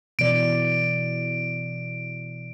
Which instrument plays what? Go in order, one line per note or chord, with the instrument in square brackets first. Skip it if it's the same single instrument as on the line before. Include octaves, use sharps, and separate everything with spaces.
[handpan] B2 E3 D5 [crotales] D7